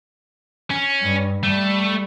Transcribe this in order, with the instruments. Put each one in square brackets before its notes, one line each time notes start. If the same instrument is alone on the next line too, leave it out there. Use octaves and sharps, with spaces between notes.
[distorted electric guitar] C#4
[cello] G2
[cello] G3 [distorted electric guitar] A3